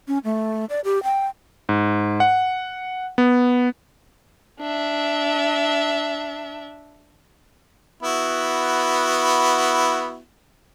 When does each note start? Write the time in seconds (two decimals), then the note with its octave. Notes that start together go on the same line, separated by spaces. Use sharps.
0.08 C#4
0.24 A3
0.70 D5
0.84 G4
1.03 G5
1.69 G#2
2.20 F#5
3.18 B3
4.60 D4 E5
8.03 B3 E4 F#4